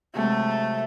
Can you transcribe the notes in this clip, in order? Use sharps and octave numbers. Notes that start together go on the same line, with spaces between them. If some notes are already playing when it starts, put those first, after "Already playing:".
C3 F#3 G#3 A3